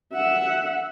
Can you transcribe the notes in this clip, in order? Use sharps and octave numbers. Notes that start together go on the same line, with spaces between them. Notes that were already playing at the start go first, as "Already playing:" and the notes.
E5 F#5